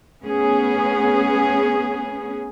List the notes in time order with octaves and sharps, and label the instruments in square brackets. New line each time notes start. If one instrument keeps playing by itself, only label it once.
[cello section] A3 B3 C#4 G#4